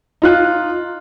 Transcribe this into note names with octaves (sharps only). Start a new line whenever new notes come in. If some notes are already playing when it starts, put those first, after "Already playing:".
D#4 F4 F#6